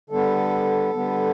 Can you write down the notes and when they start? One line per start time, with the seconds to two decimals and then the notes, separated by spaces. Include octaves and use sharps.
0.10 D3 G3 B3 A4
0.93 D3 G3 B3